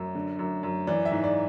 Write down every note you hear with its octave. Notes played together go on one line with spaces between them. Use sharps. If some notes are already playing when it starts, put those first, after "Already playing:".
Already playing: F#2
D3
F#2
F#2
E3 D5
E5
G#2
D5